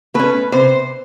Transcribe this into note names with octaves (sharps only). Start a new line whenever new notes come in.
A3 C#4 B4
C3 C5